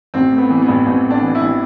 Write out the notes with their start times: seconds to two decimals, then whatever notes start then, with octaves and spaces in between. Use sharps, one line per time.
0.14 A1 C4
0.32 A2
0.38 B3
0.50 E3
0.62 B3
0.68 A1
0.86 A1 C4
1.04 A2
1.11 D4
1.22 E3
1.35 E4
1.41 A1